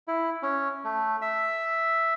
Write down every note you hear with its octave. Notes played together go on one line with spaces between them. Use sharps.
E4
C#4
A3
E5